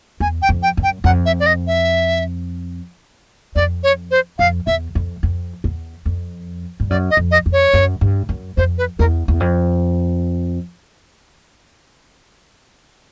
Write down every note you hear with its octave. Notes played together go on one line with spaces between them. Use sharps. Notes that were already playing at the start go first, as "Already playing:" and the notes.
E2 G#5
G5
F2
G5
F#2
G5
F2 F#5
E5
D5
D#5
E5
F2 D5
C#5
C5
F2 F5
E2 E5
F2
F2
E2
F2
G2
F#2 D5
D#5
F2
D#5
F2
C#5
F#2
G2
F#2
F2 C5
B4
E2 A#4
E2
F2